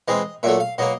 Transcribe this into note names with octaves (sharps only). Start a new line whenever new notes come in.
E3 G#3 C4 D#5
A#2 F#3 A3 E5
F5
B2 F#3 A#3 D#5